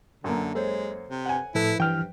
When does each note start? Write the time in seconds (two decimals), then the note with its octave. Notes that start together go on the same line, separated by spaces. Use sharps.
0.24 F#2 D3 A#3
0.55 G#3 A4 C5 C#5
1.10 C3
1.25 F#5 G#5
1.55 A2 F3 E4 A4 B4
1.80 G2 E3 G5 F6